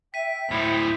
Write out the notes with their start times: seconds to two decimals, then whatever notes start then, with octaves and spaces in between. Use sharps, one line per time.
0.14 E5 G5 B6 D#7
0.51 D2 A2 E4 C5